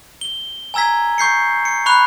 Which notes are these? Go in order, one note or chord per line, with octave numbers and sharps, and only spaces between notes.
G7
G#5 A#5 E6 G#6 B6
C#6 G6 C7 C#7
C#7
B5 C#6 F#6 F7